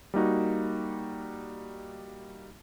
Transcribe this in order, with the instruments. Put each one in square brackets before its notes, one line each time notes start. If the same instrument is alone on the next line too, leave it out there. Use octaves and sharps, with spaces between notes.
[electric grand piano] G3 A#3 D#4 F#4